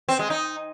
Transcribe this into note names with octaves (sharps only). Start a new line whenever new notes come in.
C4
G#3
D#4